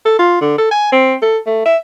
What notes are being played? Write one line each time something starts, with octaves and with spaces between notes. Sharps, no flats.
A4
F4
D3
A4
G#5
C4
A4
A3
E5